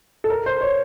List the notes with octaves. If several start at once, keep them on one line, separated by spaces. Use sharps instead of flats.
A4
A#4
C5
C#5